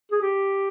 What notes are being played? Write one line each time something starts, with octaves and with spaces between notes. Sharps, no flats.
G#4
G4